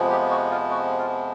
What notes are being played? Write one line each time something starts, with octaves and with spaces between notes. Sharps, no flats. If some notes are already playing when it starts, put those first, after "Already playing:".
Already playing: F2 C3 F3 G#3 B3
G4
F#4
F4
F#4
F4